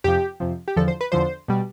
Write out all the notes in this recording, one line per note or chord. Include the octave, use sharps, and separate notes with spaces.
F2 C3 F3 G4
F2 C3 F3
G4
E2 D3 F3 A4
C5
B4
E2 D3 F3 C5
B2 G3